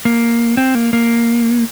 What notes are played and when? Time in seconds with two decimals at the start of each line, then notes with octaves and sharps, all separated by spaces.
0.05 A#3
0.57 C4
0.75 A#3
0.93 A#3